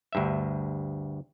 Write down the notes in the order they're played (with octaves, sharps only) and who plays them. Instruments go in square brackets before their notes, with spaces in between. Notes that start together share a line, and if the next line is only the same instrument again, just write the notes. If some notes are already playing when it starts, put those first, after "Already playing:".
[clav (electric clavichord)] D2 G2 E5